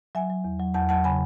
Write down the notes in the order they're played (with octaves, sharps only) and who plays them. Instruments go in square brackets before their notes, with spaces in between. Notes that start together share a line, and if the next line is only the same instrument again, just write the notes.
[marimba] F#3 E5 G#5
F#3
E2
F#3
E2 F#5 A5
F#3 F#5 A5
C#3 G#5 B5